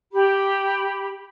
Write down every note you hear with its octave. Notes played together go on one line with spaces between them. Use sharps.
G4 B5